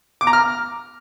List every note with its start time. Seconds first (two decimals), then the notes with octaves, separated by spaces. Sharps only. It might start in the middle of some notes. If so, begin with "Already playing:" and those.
0.21 D6
0.27 A#5
0.33 F6